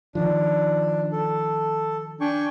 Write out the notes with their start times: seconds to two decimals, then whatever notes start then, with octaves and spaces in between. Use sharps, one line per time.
0.15 D#3 F3 D4
1.12 A4
2.21 D4 G5 G#5 C#6